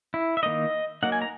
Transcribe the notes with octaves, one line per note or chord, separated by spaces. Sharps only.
E4
E5
D#3 A#3 D#4 D#5
F#3 A#3 D#4 F#5
G#5
A#5